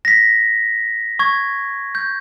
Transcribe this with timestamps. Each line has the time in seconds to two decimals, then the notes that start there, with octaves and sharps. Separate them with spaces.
0.05 A#6 B6
1.19 C#6 G#6
1.95 G6